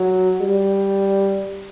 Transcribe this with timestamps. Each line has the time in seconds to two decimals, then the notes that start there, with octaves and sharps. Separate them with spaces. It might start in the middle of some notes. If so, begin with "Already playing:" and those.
Already playing: F#3
0.42 G3